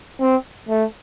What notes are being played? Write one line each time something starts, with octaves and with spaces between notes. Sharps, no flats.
C4
A3